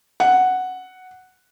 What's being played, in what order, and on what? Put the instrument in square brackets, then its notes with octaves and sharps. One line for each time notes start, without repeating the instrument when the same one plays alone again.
[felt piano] F#5